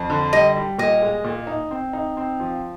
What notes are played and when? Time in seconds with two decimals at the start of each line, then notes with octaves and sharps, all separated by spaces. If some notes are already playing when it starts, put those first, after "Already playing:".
Already playing: F2
0.10 D3
0.33 G3 D#5
0.56 G3
0.79 A#2 D#5
1.02 G#3
1.24 A#2
1.47 D#4
1.71 C4
1.93 D#4
2.17 C4
2.40 F3